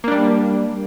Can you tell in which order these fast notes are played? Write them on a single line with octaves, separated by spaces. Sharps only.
A#3 D4 G3